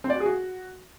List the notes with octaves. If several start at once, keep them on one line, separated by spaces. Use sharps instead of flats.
C4
D5
F#4
G#4
F#4